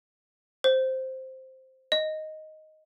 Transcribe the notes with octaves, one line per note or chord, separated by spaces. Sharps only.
C5
D#5